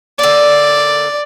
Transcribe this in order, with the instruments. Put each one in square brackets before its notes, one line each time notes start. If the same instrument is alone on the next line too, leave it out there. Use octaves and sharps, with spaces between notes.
[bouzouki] D3 A#3 [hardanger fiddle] D5